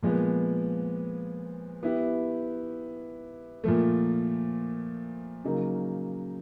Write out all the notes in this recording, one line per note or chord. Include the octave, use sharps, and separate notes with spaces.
A#2 F3 G#3 B3
B3 E4 G4
A#2 F3 A3
C#3 F#3 A#3 D#4